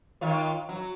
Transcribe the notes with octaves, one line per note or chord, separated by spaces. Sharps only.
D#3 F4 C#5
F#3